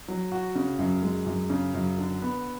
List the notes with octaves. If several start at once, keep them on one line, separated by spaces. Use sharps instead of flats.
F#3
F#4
C#3
F#2
G#3
F#2
C#3
F#2
D3
B3